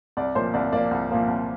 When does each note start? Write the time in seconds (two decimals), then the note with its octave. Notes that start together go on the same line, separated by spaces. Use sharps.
0.17 C2 D5
0.35 A#2 F3 A#3 C5
0.54 C2 D5
0.72 A#2 F3 A#3 D5
0.91 C2
1.10 A#2 F3 A#3
1.28 C2